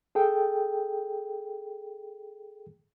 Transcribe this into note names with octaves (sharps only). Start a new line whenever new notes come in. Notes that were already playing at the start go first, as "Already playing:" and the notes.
G#4 A4 G5